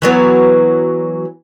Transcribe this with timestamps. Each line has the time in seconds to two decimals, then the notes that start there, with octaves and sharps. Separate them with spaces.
0.02 E3 F#3 B3